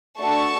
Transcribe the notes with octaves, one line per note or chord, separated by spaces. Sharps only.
A3 D4 F#4 A4 A5 C#6